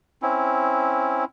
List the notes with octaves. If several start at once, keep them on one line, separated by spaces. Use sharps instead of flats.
C4 C#4 E4